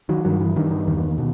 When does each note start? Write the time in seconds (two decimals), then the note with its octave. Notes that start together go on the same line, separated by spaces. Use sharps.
0.09 D#3 F#3
0.25 G2 D#3 F#3
0.40 E3
0.56 G2 D#3
0.71 D#3
0.87 E2 D#3
1.18 B2